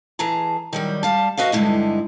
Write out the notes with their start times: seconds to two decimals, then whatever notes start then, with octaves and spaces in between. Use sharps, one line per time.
0.19 E3 G#4 A5 A#5
0.73 D#3 F#3 G3
1.03 G3 F5 A5
1.38 F#4 B4 D#5 F5
1.52 G2 D3 G#3 A#3 D#4 E4